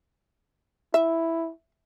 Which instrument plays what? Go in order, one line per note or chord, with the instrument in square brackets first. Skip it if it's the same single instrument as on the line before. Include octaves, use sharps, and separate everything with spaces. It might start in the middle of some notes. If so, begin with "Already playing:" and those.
[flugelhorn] E4 [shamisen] E5